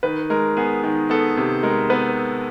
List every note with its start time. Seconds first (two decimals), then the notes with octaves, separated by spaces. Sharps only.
0.03 D#3 B4
0.30 G#3 A#4
0.57 B3 G#4
0.84 D#3
1.10 B3 A4
1.37 C3
1.63 G#3 A#4
1.90 B3 B4